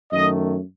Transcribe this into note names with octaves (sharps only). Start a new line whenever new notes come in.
F#2 D#3 A3 D#5